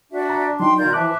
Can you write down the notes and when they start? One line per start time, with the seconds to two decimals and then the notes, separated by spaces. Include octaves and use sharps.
0.12 D4 F#4 D5 E5
0.30 A#5
0.60 F#3 D#4 G5 C6
0.78 B2 D#3 F4 A#4 D5 G6
0.93 E3 F3 E5 A5 D6 F#6